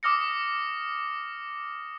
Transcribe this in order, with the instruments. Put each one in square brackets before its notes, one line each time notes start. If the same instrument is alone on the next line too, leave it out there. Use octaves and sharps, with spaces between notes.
[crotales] D6 D#6 F6 A#6 C#7